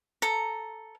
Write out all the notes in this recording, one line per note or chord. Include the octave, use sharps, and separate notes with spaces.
A4 A#5